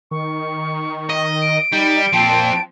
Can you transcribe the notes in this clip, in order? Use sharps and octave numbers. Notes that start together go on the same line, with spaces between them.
D#3 C#6
D#5
D7
G3 D#4
A#2 F3 C4 G5 A5